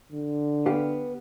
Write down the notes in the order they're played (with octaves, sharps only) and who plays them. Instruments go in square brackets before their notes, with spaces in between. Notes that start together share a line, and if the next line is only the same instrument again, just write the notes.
[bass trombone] D3
[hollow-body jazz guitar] B3 G4 F5